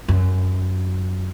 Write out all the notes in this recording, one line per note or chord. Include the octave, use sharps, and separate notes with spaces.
F#2